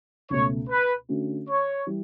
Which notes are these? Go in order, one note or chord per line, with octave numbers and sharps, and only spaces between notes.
C#2 B2 A3 C#5
B4
D3 A3 C#4 F#4
C#5
E3 G3